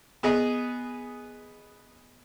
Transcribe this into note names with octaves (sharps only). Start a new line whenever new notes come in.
B3 G#4 D#5 G#5